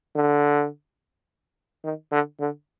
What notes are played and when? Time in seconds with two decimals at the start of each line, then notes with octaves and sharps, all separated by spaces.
0.16 D3
1.84 D#3
2.12 D3
2.40 D3